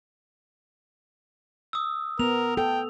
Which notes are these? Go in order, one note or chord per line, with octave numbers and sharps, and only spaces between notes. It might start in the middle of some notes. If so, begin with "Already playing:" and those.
D#6 E6
B3 A#4 F7
A4 G5